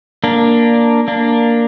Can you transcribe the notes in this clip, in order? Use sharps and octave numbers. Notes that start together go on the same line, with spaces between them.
A#3 D4
A#3 D4